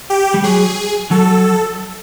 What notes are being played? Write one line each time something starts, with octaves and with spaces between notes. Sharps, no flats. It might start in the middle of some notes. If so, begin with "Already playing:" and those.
G4
G3
F#3 G#4
F#3 A4